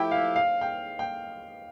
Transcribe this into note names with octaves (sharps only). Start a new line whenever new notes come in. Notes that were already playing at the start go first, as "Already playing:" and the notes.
Already playing: F3 A3 E4 G4 G5
F5
F5
G5
G5